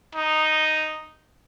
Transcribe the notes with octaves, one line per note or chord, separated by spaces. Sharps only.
D#4